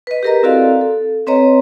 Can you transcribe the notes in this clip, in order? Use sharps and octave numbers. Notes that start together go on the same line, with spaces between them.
B4 D#5
G4 G#4 A#4 B4 D#5 A#5
C4 E4 F#4 A4 D5 F5
A4
C4 B4 C#5 D#5 A#5